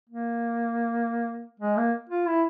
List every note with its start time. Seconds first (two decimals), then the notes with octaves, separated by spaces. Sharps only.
0.09 A#3
1.60 G#3
1.77 A#3
2.09 F4
2.27 E4